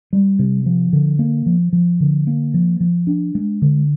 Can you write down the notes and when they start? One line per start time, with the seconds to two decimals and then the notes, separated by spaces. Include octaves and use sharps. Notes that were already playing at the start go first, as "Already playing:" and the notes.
0.13 G3
0.39 C3
0.66 F3
0.93 D3
1.19 A#3
1.46 F3
1.73 F3
2.00 D3
2.27 A#3
2.54 F3
2.80 F3
3.07 D4
3.35 G#3
3.62 D3